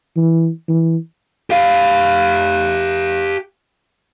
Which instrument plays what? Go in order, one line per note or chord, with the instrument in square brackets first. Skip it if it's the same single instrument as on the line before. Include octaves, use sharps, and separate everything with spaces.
[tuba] E3
E3
[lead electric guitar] G4 F5